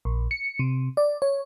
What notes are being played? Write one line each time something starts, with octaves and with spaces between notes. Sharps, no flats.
A#1
C#7
C3
D5
C#5